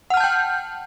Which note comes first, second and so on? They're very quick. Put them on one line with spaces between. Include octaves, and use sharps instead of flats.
F#5 F6 A5 G6 G5